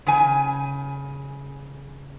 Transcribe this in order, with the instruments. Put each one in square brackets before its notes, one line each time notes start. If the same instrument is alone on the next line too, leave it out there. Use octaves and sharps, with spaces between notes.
[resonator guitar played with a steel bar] C#3 G#5